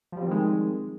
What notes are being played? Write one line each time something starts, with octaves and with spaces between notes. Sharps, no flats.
D#3 F3 G3 G#3 C4